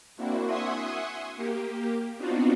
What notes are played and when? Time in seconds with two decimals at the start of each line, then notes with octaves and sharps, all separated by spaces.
0.17 A#3 C4 D4 E4 F#4
0.46 E5 F#5 G#5 C6 C#6 D#6
1.37 A#3 G4
2.17 B3 C4 D4 D#4 F4 F#4